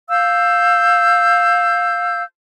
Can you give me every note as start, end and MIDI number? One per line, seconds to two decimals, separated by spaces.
0.11 2.23 77
0.11 2.23 88
0.11 2.23 91